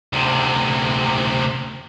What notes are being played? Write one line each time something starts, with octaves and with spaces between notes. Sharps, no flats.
D2 C3